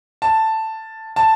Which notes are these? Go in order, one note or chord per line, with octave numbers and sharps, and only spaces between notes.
A5
A5